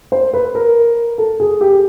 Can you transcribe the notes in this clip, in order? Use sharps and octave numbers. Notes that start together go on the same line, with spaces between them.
C5
B4
A#4
A4
G#4
G4